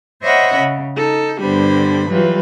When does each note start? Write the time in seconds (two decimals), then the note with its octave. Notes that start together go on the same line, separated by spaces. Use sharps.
0.22 C5 C#5 D#5 E5 F#5 B5
0.56 C#3
0.97 D#4 A4
1.39 G2 D3 G3 B3 C5 B5
2.08 E3 F#3 G3 F4 B4